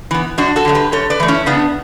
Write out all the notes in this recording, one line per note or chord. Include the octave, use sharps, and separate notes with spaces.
E3 B3
F#2 D4 F#4
F#4 A4
D3 F#3 A3
G4 B4
F#2 A4 C#5
B4 D5
E3 A3
C#4 E4
C#3 B3 D4